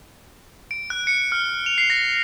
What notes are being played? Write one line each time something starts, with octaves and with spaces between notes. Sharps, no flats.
D7
F#6
C#7
F6
F7
C7
A#6